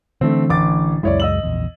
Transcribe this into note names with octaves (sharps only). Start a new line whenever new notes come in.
D3 E3 A3 C4 D4
A1 D6 A6
C#2 F#2 G#3 E4 C#5 D5
D#5 E6 F#7
A#1 E2